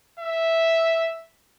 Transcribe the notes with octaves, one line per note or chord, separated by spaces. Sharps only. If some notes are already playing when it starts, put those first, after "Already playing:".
E5